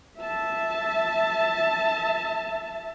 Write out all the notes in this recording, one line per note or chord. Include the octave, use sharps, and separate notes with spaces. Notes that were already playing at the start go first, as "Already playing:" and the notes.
E5 A5